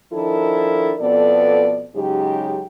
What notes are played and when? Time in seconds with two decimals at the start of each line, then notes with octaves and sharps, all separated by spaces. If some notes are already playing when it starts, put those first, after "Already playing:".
0.12 D#3 F3 D4 E4 A4 A#4
1.00 F2 B2 B3 A4 D5
1.96 G#2 C#3 F#3 D#4 G4